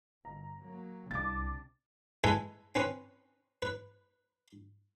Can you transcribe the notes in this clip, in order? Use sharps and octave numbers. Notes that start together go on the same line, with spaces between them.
G1 A#5
F#3 A#3
C2 C3 D4 D6 A6
G#3 A4 B4 E5 G#5
C4 C#4 B4
B4